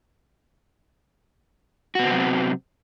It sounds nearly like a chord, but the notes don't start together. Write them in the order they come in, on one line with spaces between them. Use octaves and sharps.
F#4 B3 C4 C3 F#3